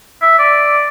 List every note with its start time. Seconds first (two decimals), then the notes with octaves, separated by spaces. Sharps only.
0.22 E5
0.39 D5